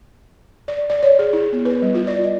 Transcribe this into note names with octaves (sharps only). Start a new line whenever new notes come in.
D5
D5
C#5
G#4
E4
B3
B4
G3
F4
D5
D#5